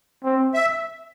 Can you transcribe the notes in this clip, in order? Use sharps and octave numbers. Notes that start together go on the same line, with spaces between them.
C4
E5